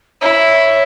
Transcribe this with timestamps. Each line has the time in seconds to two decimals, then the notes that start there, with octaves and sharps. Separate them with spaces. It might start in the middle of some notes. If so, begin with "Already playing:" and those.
0.21 E4 C#5